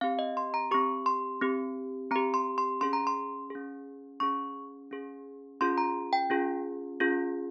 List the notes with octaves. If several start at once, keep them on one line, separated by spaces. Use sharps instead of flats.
C4 G4 F5
D#5
C6
A#5
C4 G4 C#6
C6
C4 G4
C4 G4 A#5
C6
C6
C#4 G#4 C6
A#5
C6
C#4 G#4
C#4 G#4 C#6
C#4 G#4
C#4 F4 G#4 C6
A#5
G5
C#4 F4 G#4
C#4 F4 G#4